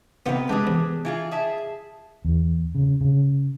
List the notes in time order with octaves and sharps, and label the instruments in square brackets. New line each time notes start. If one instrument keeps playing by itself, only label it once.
[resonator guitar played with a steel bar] C3 D#3 B4 [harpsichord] B3 F4
[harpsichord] G#3 [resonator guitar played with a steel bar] D4 G4 G#4
[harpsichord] E2
[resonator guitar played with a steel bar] E3 F4 G#4
G#4 E5 A5
[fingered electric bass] E2
C#3
C#3